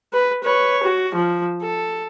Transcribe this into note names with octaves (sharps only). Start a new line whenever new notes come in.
B4
B4 C#5
F#4
F3
A4